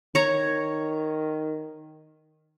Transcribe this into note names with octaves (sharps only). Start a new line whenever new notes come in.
D#3 C#5 A#5